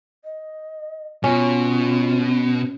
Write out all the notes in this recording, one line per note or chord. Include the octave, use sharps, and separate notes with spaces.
D#5
B2 C#4 F4